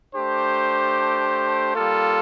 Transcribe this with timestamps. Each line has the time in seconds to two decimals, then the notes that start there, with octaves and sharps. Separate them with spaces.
0.14 A3 D4 G4 C5
1.73 G3 A#3 F4 A4